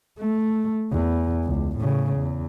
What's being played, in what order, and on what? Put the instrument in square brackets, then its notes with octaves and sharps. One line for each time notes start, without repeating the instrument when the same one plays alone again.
[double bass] A3
E2
C#2
A2 C#3
E2